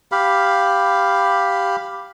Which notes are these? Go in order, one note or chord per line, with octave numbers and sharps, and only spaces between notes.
G4 F5 B5